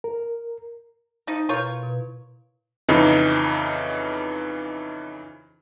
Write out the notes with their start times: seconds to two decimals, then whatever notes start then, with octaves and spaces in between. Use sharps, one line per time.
0.04 A#4
1.27 F3 D#4
1.49 B2 E4 F4 A#4 C#5 G6
1.83 B2
2.89 F2 C#3 E3 D#4